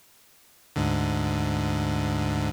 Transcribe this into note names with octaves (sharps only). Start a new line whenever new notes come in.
D2 G#2 D3